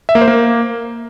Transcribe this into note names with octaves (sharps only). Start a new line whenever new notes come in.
E5
A#3
C5
A#3